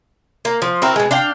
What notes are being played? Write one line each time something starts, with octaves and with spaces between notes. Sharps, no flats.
A#3
F3
C4 E4 F#4 A#4
B2 G#3
D4 F5 G5